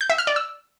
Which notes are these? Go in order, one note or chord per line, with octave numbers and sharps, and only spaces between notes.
G6
E5
F6
D5
E6